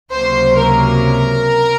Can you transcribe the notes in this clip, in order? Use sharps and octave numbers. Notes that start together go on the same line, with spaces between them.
C#2 C3 F#3 A#3 C5
A#4